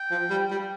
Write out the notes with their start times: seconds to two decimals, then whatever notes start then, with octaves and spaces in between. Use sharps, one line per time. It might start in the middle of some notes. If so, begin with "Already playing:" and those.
Already playing: G5
0.11 F3
0.30 G3
0.51 G3